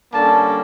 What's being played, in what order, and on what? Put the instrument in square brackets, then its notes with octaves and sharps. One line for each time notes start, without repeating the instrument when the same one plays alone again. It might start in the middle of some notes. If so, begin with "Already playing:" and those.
[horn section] D3 G3 A#3 C#4 A5